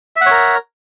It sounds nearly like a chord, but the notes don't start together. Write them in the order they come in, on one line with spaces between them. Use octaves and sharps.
E5 F#5 C#5 A#4